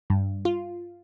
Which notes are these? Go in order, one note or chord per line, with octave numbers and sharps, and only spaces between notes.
G2
F4